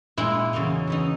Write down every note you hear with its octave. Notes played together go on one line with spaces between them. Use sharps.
A#2 G#3 D#4 E4
E2 C#3 F#3 A#3 D#4
C#3 E3 B3 D#4